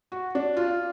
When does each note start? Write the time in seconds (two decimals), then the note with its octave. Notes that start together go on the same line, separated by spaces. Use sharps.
0.12 F#4
0.35 D4
0.57 F4